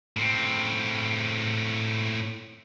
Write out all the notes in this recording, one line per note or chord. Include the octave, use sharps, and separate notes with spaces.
A2 C4